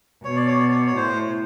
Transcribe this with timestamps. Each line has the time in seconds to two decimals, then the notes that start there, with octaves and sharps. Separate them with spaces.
0.24 B2 C#5
0.36 D5
0.48 C#5
0.59 D5
0.71 C#5
0.87 C#5
0.96 A2 C5